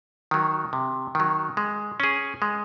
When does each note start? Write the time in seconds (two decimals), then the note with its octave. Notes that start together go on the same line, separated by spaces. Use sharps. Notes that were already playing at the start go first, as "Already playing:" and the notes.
0.31 D#3 F#3
0.73 C3
1.15 D#3 F#3
1.57 G#3
2.00 C#4 G#4
2.42 G#3